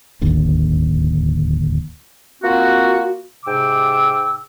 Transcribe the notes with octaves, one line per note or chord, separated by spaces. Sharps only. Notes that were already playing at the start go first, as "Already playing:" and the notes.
D1 G1 D#2 D3
A#3 C4 F4 F#4
G#2 C3 G5 D6 E6